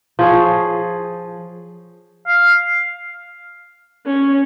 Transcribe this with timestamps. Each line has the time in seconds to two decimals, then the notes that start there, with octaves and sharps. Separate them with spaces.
0.19 F3 G#4 C#5
2.27 F5
4.06 C#4